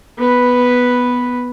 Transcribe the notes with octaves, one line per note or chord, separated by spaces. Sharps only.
B3 B4